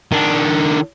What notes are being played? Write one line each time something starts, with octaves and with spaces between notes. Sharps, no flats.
D#3 D4